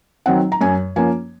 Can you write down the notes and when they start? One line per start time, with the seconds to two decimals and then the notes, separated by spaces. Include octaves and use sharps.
0.26 D#3 F#3 C4 F#5
0.52 A#5
0.61 F#2 G#5
0.96 F3 A#3 C#4 G#5